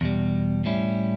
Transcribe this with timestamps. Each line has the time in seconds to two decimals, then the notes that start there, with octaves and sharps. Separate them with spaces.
0.01 E2 B2 G3
0.64 A2 G3 C#4 E4